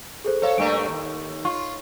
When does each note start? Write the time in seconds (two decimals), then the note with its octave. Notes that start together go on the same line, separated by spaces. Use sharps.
0.24 G#4 A4 C5
0.42 A4 C5 C#5 F5
0.58 G2 A3 A#3 D7
0.88 D#2
1.45 F4 C#6